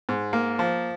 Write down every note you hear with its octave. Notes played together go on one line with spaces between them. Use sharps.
G#2
A#3
F3